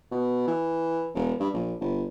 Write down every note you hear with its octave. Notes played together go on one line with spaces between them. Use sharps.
B2
E3
E1
G2
A#1
G1